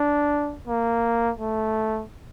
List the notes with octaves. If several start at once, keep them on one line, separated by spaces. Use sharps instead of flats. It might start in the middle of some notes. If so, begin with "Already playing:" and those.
Already playing: D4
A#3
A3